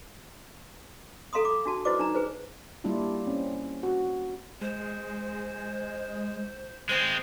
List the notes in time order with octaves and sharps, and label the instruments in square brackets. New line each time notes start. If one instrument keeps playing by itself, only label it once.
[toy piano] A4 F5 A#5 C6 D#6
D6
D4 F#4 A5
E4 F#4 B4 C5 D5 D6
D4 D#4 A#5
G#4 B4 C5
[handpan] G3 A#3 D4 E4 F4
C4 C#4
F#4
[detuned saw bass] G#3 [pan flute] C5
[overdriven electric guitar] G#3 C4 [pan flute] C5